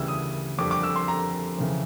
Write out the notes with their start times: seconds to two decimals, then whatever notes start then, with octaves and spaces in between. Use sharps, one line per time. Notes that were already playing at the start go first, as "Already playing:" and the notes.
Already playing: D2 C#3 E3 G3 E6
0.08 D#6
0.58 F2 D3 G3 D6
0.71 D6
0.83 E6
0.96 C6
1.08 A#5
1.58 F2 C#3 E3